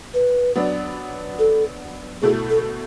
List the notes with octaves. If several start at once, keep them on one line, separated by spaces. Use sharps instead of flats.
B4
F#3 B3 D4
A4
B2 A3 E4 G#4
A4